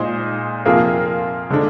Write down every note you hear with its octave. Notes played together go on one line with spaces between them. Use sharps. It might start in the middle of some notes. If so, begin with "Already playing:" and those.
Already playing: A#2 G#3 D#4 G#4 C5
C3 F3 A#3 F4 G#4
D3 G#3 D4